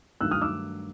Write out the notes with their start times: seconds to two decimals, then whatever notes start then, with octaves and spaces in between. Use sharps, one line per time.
0.21 G2 D#3 F#3 A3 E6 F#6
0.31 D#6 F6
0.42 D6 E6